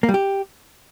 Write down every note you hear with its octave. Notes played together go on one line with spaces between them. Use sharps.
A#3
G3
G4